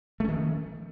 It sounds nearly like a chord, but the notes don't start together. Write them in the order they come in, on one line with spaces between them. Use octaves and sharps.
A3 C#4 D#3 F3